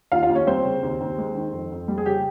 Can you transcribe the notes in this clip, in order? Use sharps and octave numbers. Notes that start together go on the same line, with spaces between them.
D#2 F4 F5
F4 F5
D#2
C#4 C#5
G3 C4 C5
C#3
D#2
D#2
G#3
D#3
F2
F2
G3
G#4
C#3 G4